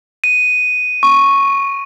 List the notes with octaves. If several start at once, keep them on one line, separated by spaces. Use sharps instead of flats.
D#7
C#6